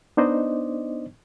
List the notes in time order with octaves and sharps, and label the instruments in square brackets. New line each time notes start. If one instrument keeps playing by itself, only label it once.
[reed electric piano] B3 D4 D#4 C5 D5 D#5